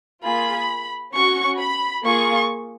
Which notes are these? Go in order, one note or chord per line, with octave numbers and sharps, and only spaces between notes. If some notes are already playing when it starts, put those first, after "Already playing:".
A#3 F4 G#4 B5
C#4 F#4 C#6
B5
A#3 F4 G#4 C#6